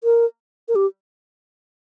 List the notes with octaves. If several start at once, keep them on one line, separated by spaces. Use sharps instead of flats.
A#4
A#4
G4